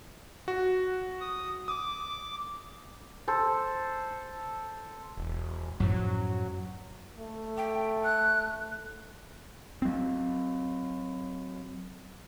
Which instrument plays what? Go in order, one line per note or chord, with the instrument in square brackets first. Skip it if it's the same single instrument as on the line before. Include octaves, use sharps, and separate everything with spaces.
[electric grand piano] F#4
[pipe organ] D#6
[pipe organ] D6 [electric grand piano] D#6
[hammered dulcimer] A4 C5
[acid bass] E1
[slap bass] F#2 A2 F3 [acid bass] F#3
[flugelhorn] A3
[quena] G5
F#6
[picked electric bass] F#3 C4